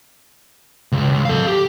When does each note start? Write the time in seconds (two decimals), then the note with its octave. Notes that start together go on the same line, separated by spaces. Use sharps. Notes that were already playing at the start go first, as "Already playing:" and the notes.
0.92 C#2
1.10 C#2
1.25 A4 F5
1.48 G4